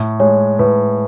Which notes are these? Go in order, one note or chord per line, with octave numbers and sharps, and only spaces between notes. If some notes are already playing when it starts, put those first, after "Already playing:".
Already playing: A2
G#3 C#5
A2 B4